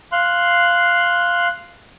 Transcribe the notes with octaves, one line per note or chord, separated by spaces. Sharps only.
F5 C6 F#6